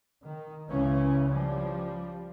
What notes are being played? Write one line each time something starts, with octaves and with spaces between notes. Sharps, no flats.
D#3
C#2 C#3 E3 C#4
F3 G3